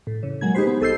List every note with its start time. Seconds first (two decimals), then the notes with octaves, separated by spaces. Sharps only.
0.07 A2
0.23 E2 C#3
0.41 A#2 F#3 G#3 A#3 G#6
0.55 D#4 G4 G#4 B4 C5
0.67 B3
0.81 B1 A4 D#5 E6 G6 C7